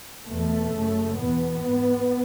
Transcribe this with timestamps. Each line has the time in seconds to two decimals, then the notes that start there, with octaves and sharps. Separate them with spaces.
0.27 E2 B2 A3
0.72 F#2 C#3
1.17 E2 B2 B3
1.62 G#2